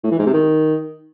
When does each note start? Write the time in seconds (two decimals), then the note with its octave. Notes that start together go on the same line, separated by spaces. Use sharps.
0.04 A2
0.11 E3
0.19 G#2
0.26 C3
0.34 D#3